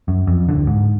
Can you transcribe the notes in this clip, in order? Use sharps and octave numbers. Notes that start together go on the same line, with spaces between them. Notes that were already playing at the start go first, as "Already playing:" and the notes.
F#2
F2
D1 G1 D3
G#2